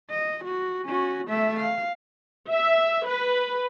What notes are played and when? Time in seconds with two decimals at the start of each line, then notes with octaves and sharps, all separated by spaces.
0.10 D#5
0.44 F#4
0.85 C#4 F#4
1.28 A3 E5
1.60 F5
2.51 E5
3.06 B4